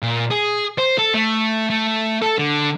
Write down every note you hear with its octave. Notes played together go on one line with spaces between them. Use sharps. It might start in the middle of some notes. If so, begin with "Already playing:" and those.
A#2
G#4
C5
A4
A3
A3
A4
D3